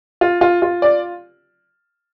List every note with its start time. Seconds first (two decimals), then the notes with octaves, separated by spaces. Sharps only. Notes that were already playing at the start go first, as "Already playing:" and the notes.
0.21 F4
0.41 F4
0.62 F4
0.82 D5